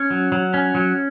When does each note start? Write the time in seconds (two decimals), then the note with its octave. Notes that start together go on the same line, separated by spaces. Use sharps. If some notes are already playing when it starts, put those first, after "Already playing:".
Already playing: C#4
0.10 F#3
0.32 F#3
0.54 C#4
0.75 F#3